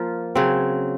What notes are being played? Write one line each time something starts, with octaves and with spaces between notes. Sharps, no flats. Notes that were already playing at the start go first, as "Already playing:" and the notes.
Already playing: F3 A#3 F4
C#3 F#3 C4